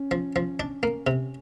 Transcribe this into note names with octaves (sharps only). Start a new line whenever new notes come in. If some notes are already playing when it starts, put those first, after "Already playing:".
Already playing: C#4
F3
F3
D4
A#3
C3